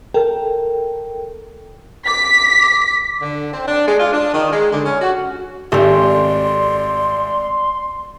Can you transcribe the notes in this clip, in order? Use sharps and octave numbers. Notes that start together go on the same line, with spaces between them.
A4 A#4 G5
D6 B6
D3
C4
D4
G#3
F4
D4
D#3
G#3
D3
C#4
F#4
G#1 A3 C4 G4 D5 C6